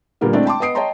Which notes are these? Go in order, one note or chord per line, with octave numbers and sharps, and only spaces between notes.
A#2 D3 G3 A#3 B3
G#3 A3 C4 D4 E4 D5
G5 A5 C6 D6
B3 D#5 D#6 C7 D7
C#5 D#5 G5 A5 A#5 C6